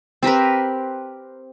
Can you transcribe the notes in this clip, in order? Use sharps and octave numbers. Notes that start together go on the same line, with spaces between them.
C4 G4 A#4 B4